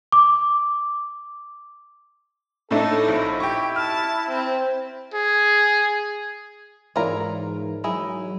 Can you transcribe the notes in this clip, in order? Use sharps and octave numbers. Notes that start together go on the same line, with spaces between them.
D6
A2 A3 D4 D#4 A4
A#1 E4
G4 G5 C#6
A5 F6
C4
G#4
G#2 E3 E4 F4 A#4 C#5 D5 A#5
F#3 D#4 E4 G#4